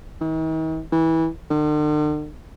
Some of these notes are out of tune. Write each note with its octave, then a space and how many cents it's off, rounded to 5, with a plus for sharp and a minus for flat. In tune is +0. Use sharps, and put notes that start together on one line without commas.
D#3 +45
E3 -20
D3 +45